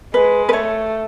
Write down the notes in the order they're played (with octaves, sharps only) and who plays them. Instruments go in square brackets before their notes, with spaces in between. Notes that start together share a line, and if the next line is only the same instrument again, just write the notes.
[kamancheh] G#3 [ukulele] B4
[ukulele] B4
[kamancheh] A3 [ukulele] C#5